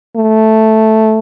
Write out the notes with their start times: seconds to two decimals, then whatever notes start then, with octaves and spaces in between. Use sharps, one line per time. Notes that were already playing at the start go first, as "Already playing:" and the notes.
0.17 A3